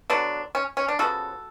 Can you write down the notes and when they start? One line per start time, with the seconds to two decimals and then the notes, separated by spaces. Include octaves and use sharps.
0.10 D3 F#3 B3 D4
0.55 C#4
0.77 C#4
0.88 D4
0.99 C#3 F3 B3 F#4 A4